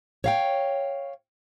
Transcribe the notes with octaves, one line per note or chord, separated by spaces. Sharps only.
C#5 F5 G5